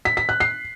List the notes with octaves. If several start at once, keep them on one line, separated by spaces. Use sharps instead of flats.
B6
B6
F#6
C7